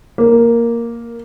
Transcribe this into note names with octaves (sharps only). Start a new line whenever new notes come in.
A#3